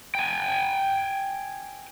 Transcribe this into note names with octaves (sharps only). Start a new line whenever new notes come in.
G5 G#5